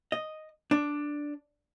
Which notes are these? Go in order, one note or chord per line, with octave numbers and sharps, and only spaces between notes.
D#5
D4